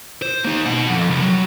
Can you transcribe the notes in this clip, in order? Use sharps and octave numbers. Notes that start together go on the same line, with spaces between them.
C5
A#3 D#4
B2 F#5
F2
C2
F#3